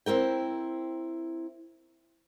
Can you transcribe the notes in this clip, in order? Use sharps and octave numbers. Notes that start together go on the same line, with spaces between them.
C4 E4 A#4 G5